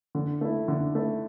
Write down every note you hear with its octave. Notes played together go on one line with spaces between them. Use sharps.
D3
A3 E4
D3
A3 E4